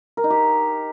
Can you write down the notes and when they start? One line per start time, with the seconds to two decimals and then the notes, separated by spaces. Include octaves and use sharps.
0.17 A#4
0.24 D#4
0.30 G4